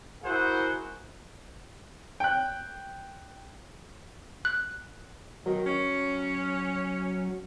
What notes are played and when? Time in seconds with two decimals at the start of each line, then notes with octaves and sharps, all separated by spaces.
0.24 E4 F#4 G#4 A#4 C5 F#5
2.20 G5 F#6
4.45 F#6
5.46 B2 D#3 F#3
5.66 C#4